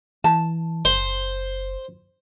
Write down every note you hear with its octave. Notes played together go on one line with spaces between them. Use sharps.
E3 A5
F#1 C5